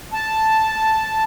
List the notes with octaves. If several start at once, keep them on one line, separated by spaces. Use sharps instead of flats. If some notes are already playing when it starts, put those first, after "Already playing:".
A5